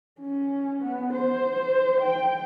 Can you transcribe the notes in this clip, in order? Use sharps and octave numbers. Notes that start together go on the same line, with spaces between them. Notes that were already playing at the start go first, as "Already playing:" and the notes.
C#4
B3
C5
G5